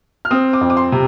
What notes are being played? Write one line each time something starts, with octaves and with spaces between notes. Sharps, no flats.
F6
C4 D#6
D6
F2
D6
C6
C3